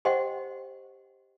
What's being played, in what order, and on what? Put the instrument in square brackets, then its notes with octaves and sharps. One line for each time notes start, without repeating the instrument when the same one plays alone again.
[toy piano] G4 C5 D#5 F#5 G5 C6